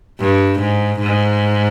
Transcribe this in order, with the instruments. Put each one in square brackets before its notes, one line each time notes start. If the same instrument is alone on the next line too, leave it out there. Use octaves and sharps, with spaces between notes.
[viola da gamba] G2
G#2
G#2